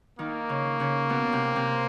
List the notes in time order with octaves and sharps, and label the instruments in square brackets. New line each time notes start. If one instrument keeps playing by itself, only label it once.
[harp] D#3 D#4 [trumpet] A#3
[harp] C#3 C#4
C#3 C#4
B2 B3
C3 C4
C3 C4